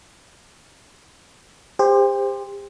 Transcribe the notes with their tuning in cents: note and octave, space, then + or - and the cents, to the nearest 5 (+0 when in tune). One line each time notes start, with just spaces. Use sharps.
G4 +35 C5 +0